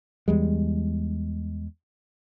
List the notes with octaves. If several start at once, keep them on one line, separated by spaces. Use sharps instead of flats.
E2 G3 G#3